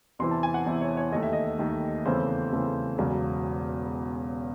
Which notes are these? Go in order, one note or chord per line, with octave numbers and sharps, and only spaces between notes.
E2 C3 E3 C4 E4 C6
A5
G#5
F#5
E2 C3 E3 C4 E4
C#5
C#5
D#2 D#3 A3 D#5
E5
D#5
D#2 D#3 A3
E2 C#3 E3 A3 C4 C5
E2 C#3 E3 A3 C4
E1 E2 C#3 F#3 C#4